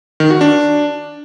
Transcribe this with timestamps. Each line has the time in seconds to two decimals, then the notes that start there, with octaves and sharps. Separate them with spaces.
0.20 D#3
0.30 F#4
0.41 D4